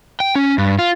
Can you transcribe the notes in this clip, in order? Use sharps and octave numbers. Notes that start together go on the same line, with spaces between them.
G5
C#4
G2
F4